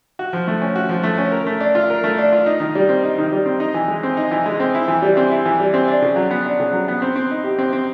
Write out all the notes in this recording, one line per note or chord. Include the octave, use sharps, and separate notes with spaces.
F#4
F3
A3
C#4
F#4
F3
A3
C#4
A#4
A3
D4
F4
A#4
A3
D4
F4
D#4
D#3
G3
C4
D#4
D#3
G3
C4
D#4
E3
G#3
C4
D#4
E3
G#3
C4
E4
E3
G3
C4
E4
E3
G3
C4
D4
C#3
F#3
B3
D4
C#3
F#3
B3
C4
C4
D#4
G4
C4
C4